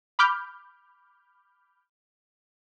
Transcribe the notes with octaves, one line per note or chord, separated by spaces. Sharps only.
B5 D6 F6 G6